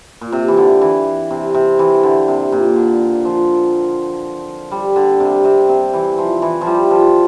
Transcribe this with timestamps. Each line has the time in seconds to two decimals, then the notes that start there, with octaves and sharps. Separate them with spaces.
0.21 A#2
0.32 C3
0.48 E3
0.57 D3
0.81 E3
1.31 C3
1.54 C3
1.79 E3
2.03 D3
2.28 C3
2.52 A#2
2.76 D3
3.25 F3
4.72 G3
4.96 D3
5.20 C3
5.45 C3
5.69 C3
5.93 E3
6.14 E3 F3
6.42 E3
6.61 F3
6.67 G3
6.91 F3